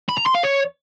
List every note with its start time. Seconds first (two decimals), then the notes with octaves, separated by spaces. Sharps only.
0.09 B5
0.18 A#5
0.26 C6
0.35 F5
0.43 C#5